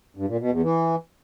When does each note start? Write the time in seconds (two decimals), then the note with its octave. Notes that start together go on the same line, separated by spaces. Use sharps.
0.16 G2
0.28 A#2
0.39 B2
0.51 E2
0.62 E3